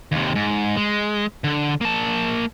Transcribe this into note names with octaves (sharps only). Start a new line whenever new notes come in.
D#2 C3
G#2
G#3
D3
A#3 A5